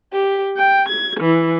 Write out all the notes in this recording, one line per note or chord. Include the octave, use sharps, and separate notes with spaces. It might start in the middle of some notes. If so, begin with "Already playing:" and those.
G4
G5
G#6
E3